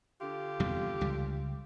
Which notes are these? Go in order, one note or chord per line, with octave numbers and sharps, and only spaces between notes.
D3 F4 G4
E2 C3 G3
C#2 G3